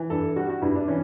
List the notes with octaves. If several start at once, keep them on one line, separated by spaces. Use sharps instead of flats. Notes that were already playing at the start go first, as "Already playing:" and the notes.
Already playing: E3
G2 A4
G3 F#4
F#4
G2 E4
D4
E3 C#4